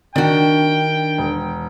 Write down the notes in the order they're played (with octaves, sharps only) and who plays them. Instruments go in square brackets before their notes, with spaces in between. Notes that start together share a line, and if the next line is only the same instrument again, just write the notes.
[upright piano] D#3 [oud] D4 F#4 [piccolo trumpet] G5
[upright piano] E1